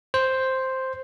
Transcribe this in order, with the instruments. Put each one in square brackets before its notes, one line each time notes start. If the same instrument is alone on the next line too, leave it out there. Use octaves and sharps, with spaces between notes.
[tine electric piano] C5